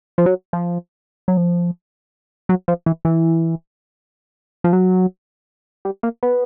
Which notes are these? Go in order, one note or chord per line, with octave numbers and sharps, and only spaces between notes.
F3
F#3
F3
F#3
F3
F#3
F3
E3
E3
F3
F#3
G3
A#3
B3